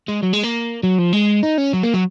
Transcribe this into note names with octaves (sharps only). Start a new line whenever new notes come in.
G#3
F#3
G#3
A#3
F#3
F3
G#3
D#4
C#4
F#3
A#3
F#3